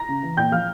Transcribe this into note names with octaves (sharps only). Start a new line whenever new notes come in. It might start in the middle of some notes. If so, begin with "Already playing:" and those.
Already playing: A#5 A#6
C#3
E3
A#2 G5 G6
F3 F5 F6